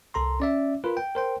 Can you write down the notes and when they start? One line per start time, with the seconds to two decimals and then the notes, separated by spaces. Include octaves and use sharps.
0.14 C2 A4 A#5 C6
0.40 C#4 D5 E5
0.84 F4 A#4 B4
0.97 G5
1.15 A#4 C5 G5